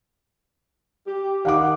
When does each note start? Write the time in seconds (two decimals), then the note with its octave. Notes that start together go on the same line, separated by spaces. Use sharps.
1.06 G4
1.45 D#3 F5 F#5 D6